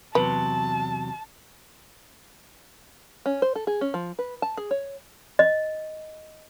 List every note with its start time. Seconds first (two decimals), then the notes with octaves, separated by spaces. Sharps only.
0.15 E2 C3 F#3 B4 A5
3.26 C#4
3.42 C5
3.55 A4
3.67 G#4
3.81 C#4
3.94 F3
4.19 B4
4.42 A5
4.57 G#4
4.71 C#5
5.39 D#5